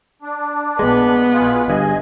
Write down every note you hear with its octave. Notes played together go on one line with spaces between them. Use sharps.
D4
A#1 G#3 B3 B4
B2 F4 G#4
G1 G2 G#4 D#5 G#5